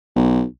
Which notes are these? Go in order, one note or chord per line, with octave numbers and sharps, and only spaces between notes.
B1